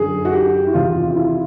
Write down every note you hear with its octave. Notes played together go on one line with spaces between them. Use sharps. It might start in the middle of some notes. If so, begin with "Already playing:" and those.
Already playing: F#2 D3 G#4
F#4
G4
E4
E2 C3 D#3 F4
F4
E4